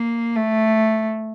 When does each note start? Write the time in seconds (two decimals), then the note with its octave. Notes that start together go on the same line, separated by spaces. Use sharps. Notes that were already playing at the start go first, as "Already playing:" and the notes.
Already playing: A#3
0.35 A3